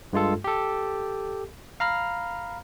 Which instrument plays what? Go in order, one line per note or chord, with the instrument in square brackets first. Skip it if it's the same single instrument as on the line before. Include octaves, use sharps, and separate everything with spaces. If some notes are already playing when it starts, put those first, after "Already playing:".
[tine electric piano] G2 G#3 F4 A4
G4 A4
F5 A#5 B5 F6